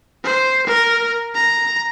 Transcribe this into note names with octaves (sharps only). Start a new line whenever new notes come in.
C5
A#4
A#5